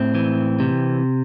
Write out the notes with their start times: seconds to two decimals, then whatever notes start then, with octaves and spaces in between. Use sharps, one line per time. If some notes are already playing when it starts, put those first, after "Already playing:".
Already playing: A2 C4
0.15 E3
0.60 C3